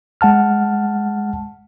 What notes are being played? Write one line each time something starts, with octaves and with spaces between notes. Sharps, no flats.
G#3 F#5 A5 F6